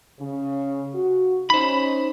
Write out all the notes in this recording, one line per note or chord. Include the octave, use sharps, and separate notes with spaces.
C#3
F#4
C#4 D#4 C5 B5